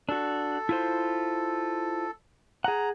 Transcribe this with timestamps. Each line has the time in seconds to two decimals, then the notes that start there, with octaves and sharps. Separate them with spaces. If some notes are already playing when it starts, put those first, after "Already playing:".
0.09 D4 F#4 A4
0.69 E4 F4 C5
2.64 G#4 F#5 A#5